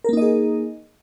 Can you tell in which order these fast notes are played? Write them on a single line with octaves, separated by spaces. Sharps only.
A#4 A#3 D#4 D#5 G#4